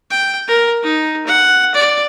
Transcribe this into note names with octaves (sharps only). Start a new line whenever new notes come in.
G5
A#4
D#4
F#5
D5